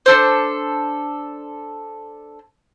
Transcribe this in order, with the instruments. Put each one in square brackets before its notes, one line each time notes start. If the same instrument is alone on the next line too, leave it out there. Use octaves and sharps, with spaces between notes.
[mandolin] D4 A4 C5